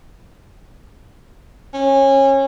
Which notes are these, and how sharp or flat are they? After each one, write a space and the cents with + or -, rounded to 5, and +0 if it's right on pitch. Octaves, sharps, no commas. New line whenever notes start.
C#4 -25